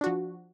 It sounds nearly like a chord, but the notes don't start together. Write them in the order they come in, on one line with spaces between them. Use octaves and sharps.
D4 F#4 F3